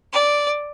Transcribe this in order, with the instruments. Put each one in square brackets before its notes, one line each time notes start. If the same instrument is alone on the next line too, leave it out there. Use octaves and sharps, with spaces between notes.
[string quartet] D5